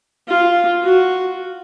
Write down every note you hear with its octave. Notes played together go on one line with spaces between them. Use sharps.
F4
F#4